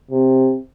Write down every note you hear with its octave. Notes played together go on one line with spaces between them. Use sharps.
C3